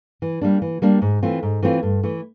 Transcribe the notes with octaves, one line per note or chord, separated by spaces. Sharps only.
E3
G3 A#3 D4
E3
G3 A#3 D4
G#2
E3 A3 C4 F4
G#2
E3 A3 C4 F4
G2
E3 A3